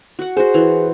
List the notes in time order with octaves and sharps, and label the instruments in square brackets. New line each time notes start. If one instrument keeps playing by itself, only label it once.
[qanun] F#4 F#5
[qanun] F#4 C5 [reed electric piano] G#4
[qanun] E3